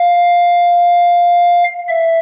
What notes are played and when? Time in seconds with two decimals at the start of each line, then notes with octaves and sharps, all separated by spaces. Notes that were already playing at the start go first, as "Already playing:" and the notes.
Already playing: F5
1.89 E5